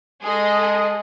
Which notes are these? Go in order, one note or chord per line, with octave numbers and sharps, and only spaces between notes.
G#3 G#4 A4 D#5